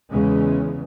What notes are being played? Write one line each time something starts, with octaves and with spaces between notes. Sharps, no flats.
E2 C#3 E3 G#3 C#4